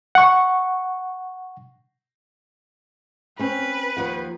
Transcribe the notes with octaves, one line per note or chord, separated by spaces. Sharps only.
F#5 C#6
C4 C#4 B4
D#2 F3 F#5